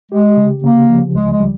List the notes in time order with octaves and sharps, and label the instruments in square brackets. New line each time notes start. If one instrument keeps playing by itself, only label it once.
[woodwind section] G#3 [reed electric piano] G4
[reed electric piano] C#3
[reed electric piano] C#3 [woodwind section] A#3
[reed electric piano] F3
[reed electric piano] C#2 [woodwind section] G#3
[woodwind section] G#3
[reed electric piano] G3